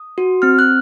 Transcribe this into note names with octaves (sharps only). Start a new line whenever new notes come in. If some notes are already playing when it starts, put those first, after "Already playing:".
Already playing: D#6
F#4
C4 F6
F#6